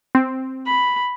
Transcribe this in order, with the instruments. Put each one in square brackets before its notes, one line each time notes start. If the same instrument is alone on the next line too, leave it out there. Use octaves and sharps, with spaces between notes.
[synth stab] C4
[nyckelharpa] B5